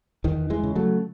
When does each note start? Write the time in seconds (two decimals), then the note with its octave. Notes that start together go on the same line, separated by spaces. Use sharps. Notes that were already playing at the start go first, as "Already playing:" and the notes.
0.24 E2 D#3
0.50 E3 G#3
0.63 C#3
0.75 F#3 A3